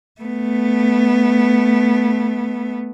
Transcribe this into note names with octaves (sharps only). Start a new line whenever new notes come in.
A3 B3